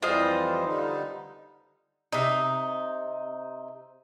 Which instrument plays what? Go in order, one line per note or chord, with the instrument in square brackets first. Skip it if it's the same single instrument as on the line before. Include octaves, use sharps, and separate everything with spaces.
[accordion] F2 E3 G3 [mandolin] F4 C5 D#5
[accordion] D3 G3 D#4
[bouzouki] C3 D#4